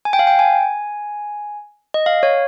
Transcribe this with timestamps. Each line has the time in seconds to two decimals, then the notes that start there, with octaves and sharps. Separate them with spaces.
0.05 G#5
0.13 G5
0.19 F5
0.27 G5
0.39 G#5
1.94 D#5
2.06 F5
2.23 C#5